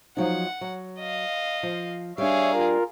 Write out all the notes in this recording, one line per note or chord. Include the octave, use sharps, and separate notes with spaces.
F3 F#3 D#4 F#5
F#3
D#5 F5
F3
G3 D4 G#4 C#5 E5 F5
F4 A#4